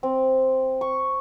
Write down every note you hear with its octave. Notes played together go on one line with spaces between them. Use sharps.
C4
C#6